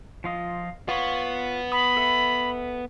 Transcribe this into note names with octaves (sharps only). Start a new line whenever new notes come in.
F3 F4 D#5
B3 F4 C#5
B5 D#6
A4 E5